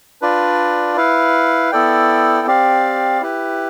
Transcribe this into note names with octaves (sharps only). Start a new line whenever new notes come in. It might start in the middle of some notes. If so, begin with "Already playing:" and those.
D4 F4 B4 D5
E4 B4 F5
B3 E4 A4 D5 G5
C4 G4 D5 F5
E4 G4 B4